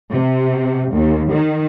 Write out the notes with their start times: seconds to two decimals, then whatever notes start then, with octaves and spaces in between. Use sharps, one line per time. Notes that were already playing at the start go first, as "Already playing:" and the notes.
0.12 C3
0.95 D#2
1.32 D#3